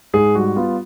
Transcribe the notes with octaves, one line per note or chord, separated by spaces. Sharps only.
G#2 G#4
G3 F#4
B3 F4